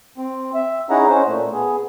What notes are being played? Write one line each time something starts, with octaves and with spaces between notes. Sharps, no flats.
C4
E5
C#4 D#4 E4 G#4 F#5 A#5
C#4 C5
A#2 A3
B3 G#4